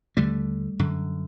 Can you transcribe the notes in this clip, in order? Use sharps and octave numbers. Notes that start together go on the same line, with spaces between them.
D#2 D3 G3 A3
F#2 D3